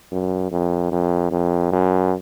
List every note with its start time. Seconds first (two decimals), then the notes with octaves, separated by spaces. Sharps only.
0.12 F#2
0.51 F2
0.91 F2
1.31 F2
1.72 F#2